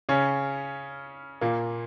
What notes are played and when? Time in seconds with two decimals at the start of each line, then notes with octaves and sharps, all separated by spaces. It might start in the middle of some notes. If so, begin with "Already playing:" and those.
0.09 C#3 C#4
1.41 A#2 A#3